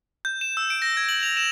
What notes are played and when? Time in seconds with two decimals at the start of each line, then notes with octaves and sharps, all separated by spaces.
0.25 G6
0.41 E7
0.57 E6
0.70 D7
0.82 A#6
0.97 G#6
1.09 F#7
1.23 F7
1.37 E7